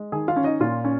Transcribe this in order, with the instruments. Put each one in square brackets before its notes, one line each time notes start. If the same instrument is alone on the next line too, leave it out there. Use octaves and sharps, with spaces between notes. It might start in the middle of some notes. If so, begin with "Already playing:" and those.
Already playing: [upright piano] G#3
D#3 G#4 G#5
F4 F5
C#4
D#4 D#5
A#2 F4
C#4